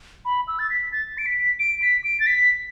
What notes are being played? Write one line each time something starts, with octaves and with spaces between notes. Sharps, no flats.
B5
E6
A6
B6
A6
D7
B6
D7
B6
D7
A6
B6